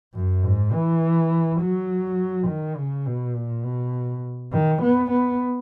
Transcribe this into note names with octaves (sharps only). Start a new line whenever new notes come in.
F#2
G#2
E3
F#3
D#3
C#3
B2
A#2
B2
D#3
B3
B3